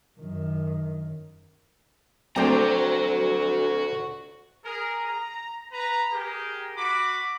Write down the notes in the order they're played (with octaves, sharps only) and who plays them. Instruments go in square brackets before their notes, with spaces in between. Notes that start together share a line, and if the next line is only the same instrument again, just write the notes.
[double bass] F#2 D#3
[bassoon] D2 [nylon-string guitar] A3 C4 [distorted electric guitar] F#4 A#5 [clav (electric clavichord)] C5 D5 G5
[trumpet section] G#4 A#4
A#5
B4 A#5
G4 G#4 A#4
F#4 B5 D6